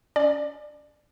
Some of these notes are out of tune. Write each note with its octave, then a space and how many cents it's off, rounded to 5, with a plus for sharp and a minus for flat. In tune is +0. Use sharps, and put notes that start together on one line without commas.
C#4 +35 D5 +25